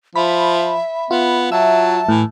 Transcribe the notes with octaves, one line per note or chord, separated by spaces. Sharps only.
F3 E5 B5
B3 F4
F#3 E5 A5
A2 E3